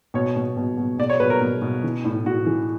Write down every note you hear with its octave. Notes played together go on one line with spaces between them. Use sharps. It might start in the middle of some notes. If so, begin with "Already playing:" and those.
B2 C#5
B2
B2
B2
B2 D5
C#5
B2 B4
A#4
B2
B2
E3
A2
A2 F#4
E3